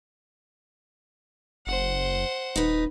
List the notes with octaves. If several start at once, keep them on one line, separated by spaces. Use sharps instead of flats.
F#1 C5 F#5
D#1 D#4 B4